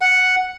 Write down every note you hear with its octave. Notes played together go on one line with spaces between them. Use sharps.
F#5